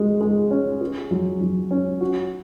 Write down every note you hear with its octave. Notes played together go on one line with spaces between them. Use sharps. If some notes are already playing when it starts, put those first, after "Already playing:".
Already playing: G#3 F#4
G#3
C#4
G#4
F#3
F#3
C#4
F#4